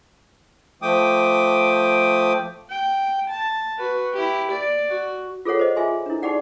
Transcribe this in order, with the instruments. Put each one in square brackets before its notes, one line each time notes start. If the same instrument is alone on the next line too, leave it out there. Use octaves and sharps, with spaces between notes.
[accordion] F3 A3 G5 D6 D#6
[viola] G5
A5
F#4 B4
E4 G4
D5
F#4
[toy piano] F4 G#4 A4 C#5 F#5
C5 D#5
F4 G#4 E5 G#5 C6
D4 E4
D#4 G4 G#4 D5 F#5 G5